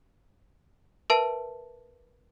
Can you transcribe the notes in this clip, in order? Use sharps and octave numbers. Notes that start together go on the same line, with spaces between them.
A#4 B4 E5 A5 D7